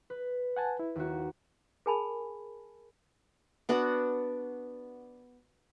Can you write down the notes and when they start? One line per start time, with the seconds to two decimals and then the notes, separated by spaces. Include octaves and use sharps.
0.10 B4
0.57 F#5 G#5 A5
0.79 E4
0.95 D#2 F#4
1.86 G#4 A#4 G#5 A5 B5
3.69 B3 D4 F#4 F#5